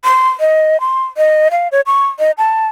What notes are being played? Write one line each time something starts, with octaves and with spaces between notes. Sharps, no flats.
C6
D#5
C6
D#5
F5
C#5
C#6
D#5
A5